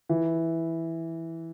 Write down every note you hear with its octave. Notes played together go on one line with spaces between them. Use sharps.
E3